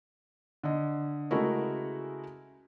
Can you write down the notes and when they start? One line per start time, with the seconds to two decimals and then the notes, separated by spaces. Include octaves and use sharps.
0.64 D3 D#5
1.31 C#3 G#3 A3 E4 F#4 A#4